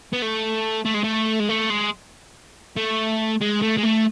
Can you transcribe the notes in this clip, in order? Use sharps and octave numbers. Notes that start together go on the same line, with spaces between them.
B3
A3
A3
G#3
A3
G#3
A3
G#3
A3
G#3
A3
G#3
A3